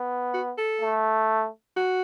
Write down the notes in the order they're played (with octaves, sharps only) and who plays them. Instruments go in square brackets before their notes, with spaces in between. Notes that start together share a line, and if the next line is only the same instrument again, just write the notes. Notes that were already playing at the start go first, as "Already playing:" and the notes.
Already playing: [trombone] B3
[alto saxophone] F#4
A4
[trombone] A3
[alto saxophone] F#4